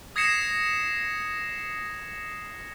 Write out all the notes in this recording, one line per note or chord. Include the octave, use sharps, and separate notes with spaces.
D#6 G#6 A#6 C7 C#7 E7